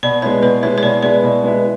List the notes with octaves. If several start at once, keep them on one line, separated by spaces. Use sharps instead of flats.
B2 D5
G#3 B3 E4 C#5
B2 B4
G#3 B3 E4 C#5
C#5
B2 D5
G#3 B3 E4 D5
B2
G#3 B3 E4